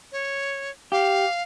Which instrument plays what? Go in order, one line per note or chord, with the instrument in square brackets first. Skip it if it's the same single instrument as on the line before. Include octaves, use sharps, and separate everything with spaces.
[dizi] C#5
[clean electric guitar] G4 [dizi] F5